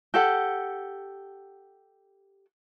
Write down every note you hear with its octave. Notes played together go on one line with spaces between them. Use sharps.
G4 A4 F#5